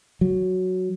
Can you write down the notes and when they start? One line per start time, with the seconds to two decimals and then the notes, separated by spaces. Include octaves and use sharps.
0.21 F#3